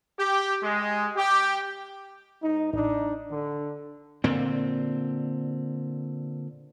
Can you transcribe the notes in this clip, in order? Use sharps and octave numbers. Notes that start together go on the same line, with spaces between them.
G4
G#3
G4
G#2 D#4
A1 D4 D#4
D3
A#2 D3 C4